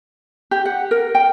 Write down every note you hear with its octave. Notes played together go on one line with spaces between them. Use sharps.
G4
F#5
A#4
G5